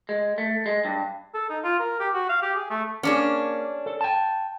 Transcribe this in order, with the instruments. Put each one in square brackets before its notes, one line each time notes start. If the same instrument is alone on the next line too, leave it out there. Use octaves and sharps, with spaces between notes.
[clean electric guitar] G#3
A3
G#3
G2
[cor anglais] A4
D#4
F4
A#4
G4
F#4
F5
G4
G#4
A3
[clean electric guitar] A#3 [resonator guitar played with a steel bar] C#4 D4 G#4
[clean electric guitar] A4
G5 A5